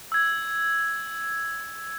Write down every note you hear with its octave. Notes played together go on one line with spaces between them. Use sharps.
E6 G#6